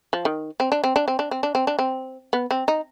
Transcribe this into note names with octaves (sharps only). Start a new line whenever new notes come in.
F3
D#3
C4
D4
C4
D4
C4
D4
C4
D4
C4
D4
C4
B3
C4
D#4